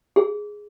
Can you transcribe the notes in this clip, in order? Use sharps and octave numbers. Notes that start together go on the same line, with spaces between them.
G#4